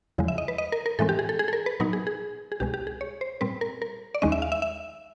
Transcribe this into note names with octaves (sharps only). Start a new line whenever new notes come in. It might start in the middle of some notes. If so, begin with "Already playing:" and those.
E2 C#3 F3 G#3
E5
D#5
B4
D#5
A#4
A#4
A2 E3 G#3 C4 A4
G4
G#4
A4
G#4
A4
A#4
B4
A#2 F#3 B3 D#4 A#4
G#4
G#4
G#4
C2 B2 G#3 G4
G4
G#4
C#5
C5
A#2 G3 C4 B4
A#4
A#4
D5
D#2 D#3 G#3 C#4 D#5
E5
F5
E5
E5